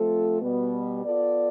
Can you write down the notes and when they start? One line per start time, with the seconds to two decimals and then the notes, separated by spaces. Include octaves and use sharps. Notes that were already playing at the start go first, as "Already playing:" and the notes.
Already playing: F3 A3 C4 F4 A4
0.41 B2 G3 B3
1.04 B3 F4 A4 D5